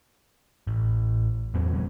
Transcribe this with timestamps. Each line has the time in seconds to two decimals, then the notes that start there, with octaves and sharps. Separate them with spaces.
0.67 A1
1.54 E2 E3 F#3 C4
1.73 A#2 F#3 G#3